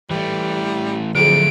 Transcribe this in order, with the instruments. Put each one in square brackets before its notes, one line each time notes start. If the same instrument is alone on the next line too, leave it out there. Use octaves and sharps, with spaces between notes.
[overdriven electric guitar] E3 A3 [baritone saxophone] G3
[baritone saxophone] F2 [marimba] D3 F3 G#4 [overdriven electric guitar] F#3 A3 [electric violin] D7